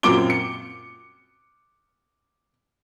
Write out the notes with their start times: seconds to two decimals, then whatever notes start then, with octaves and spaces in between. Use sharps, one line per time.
0.03 F#2 A#2 C4 D6 D7 G7
0.30 C#7